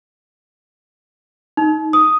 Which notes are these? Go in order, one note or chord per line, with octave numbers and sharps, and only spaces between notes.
D#4
D#6